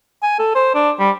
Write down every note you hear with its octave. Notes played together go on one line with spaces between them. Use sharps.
G#5
A4
C5
D4
G3